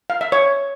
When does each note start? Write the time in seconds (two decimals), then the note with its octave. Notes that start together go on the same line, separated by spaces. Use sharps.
0.10 F5
0.21 E5
0.32 C#5